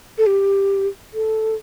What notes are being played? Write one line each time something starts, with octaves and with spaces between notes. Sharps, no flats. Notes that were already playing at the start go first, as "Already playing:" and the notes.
A4
G4
A4